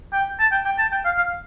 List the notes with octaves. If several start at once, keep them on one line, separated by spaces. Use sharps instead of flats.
G5
A5
G5
G5
A5
G5
F5
F5